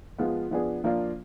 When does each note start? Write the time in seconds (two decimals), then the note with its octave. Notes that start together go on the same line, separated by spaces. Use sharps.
0.18 F3 G#3 B3 F4
0.51 F3 B3 D4 G#4
0.84 F3 A#3 D4 F4